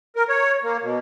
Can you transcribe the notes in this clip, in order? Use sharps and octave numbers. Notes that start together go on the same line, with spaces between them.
A#4
C#5
A#3
B2